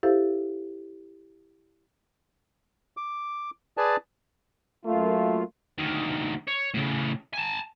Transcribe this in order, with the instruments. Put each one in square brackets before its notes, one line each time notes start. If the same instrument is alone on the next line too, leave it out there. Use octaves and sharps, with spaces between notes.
[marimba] E4 G4 A4 C5 E5 F5
[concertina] D6
G#4 B4 D5 G#5 A5
[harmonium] F#2 A#3 F4 [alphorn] A3
[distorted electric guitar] D2 D#3
C#5
A2 C#3
G#5 A5